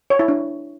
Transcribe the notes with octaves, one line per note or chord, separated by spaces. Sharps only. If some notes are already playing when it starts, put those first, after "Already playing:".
C#5
E4
D4